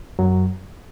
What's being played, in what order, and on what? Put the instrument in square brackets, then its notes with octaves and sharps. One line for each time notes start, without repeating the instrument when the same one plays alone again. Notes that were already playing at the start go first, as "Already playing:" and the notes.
[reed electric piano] F#2 F#3